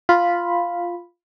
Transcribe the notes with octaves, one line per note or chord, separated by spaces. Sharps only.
F4 B5